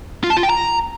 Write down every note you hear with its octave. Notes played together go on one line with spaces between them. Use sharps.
F4
A5
F4
G5
A#5